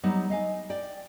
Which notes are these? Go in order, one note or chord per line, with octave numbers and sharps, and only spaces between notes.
F#3 G3 B3 D#4
D#5 F5 G#5
D5 G5